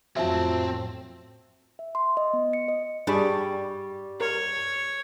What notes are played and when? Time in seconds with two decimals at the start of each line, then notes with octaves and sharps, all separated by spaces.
0.16 F2 A2 F#3 C4 F4 E5 A5
1.79 E5
1.95 C6
2.17 D#5
2.33 B3
2.53 C#7
2.68 D#5
3.07 G2 G3 D4 G#4 B5 C#6
4.21 A#4 C#5